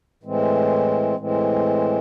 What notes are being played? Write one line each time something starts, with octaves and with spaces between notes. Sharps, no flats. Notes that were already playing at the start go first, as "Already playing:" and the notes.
A2 E3 G#3 C4
A2 E3 G#3 C4